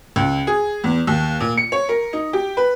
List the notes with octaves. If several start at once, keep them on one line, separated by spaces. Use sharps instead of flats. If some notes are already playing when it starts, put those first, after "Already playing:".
C#2
G#4
E2
D#2
A#2
C#7
C#5
A#4
D#4
G4
B4